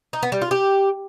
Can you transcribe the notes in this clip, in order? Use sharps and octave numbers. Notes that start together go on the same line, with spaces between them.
D#4
B3
G3
F4
G4